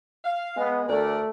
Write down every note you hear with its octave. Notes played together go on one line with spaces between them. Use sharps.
F5
G#3 B3
D2 A3 A#4 D5